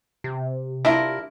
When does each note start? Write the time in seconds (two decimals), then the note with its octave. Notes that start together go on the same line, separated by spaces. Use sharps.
0.24 C3
0.85 D4 E4 F4 A#4